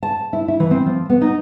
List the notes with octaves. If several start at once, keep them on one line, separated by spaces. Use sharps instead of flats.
A5
E4
E4
E3
C4
F3
B3
D#4